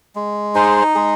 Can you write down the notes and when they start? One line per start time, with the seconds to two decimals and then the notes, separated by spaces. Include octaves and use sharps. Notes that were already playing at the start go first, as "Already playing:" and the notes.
0.15 G#3
0.55 D#4 G#4 C5
0.95 G#3 G#4